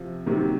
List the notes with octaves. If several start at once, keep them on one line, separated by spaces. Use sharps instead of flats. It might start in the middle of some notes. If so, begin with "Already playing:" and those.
Already playing: C3 F3
C3 D#3 F#3